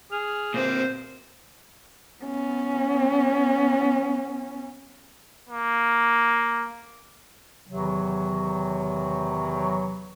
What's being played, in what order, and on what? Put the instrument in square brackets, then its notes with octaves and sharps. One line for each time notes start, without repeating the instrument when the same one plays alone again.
[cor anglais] G#4 [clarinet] F6
[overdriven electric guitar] A#2 C4 [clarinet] A#4 [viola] C5
[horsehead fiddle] B3 C#4
[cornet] A#3
[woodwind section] E2 C3 D#3 E3 F#3